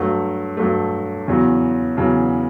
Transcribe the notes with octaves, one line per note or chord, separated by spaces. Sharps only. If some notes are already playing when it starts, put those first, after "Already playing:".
Already playing: G2 F#3 A3
G2 F#3 A3
E2 C#3 F#3
E2 C#3 F#3